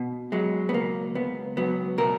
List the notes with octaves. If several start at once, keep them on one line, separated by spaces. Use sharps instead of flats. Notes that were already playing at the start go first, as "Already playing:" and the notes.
Already playing: B2
F#3 G#3
B3
C#2 A#3
C#2 B3
F#3 B3
B2 A#4